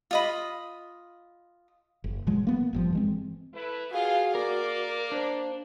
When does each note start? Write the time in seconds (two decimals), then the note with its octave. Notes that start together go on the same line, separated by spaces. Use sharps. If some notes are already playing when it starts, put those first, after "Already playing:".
0.11 F4 D#5 B5
2.04 F#1
2.27 A#2 E3 F#3 G#3
2.47 A#3 B3
2.73 G1 G2 F3
2.93 E3 G#3 C4
3.53 A3 E4 B4
3.91 B2 F4 F#4 G#4 F5
4.35 A#3 A#4 D5
5.12 D4 C5